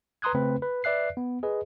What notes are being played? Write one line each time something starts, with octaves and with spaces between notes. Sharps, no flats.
B4 A#5 C6 D#6 F#6 G#6
C#3 A3 C4 B4
B4
B4 D5 E5 F#6 C7
B3
G#4 B4 D#5